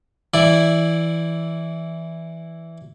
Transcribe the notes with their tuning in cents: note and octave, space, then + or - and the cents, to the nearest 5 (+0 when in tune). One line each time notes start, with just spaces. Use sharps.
E3 +0 E4 +0 D5 +0